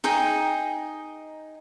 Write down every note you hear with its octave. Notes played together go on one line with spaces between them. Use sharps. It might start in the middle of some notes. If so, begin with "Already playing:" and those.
D#4 G#4 D#5 G5